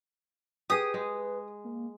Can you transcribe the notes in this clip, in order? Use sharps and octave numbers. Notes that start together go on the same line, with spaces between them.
G4 G#4 B4 D#6
G#3
A#3